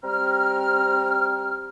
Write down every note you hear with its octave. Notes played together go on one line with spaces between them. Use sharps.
G3 C4 A#5 F6